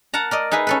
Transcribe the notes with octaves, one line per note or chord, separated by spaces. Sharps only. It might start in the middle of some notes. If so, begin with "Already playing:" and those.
A#4 F#5 A5 A#5
A#4 D5 D#5
D#4 G#4 B4 E5
C#4 A4 B4